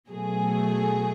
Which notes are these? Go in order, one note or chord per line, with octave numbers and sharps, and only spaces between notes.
B2 F#3 A3 G#4